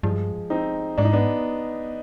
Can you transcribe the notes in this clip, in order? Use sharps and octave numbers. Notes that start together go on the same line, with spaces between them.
G2 F3 G#3
C4 D#4
G#2 D4
D#4
B3 D4